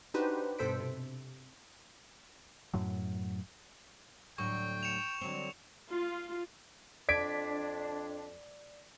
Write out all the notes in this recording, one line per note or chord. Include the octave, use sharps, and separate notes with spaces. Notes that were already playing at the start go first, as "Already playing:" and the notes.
D4 D#4 F#4 G4 B4 C5
G2 B2 A4 C5 B6 D7
C3
F#2 A2 F#3
D2 A2 F#3 G5 C#6
C#7 E7 F7
D3 F#3 C4
F4
F2 D4 D5 G#6 B6 D7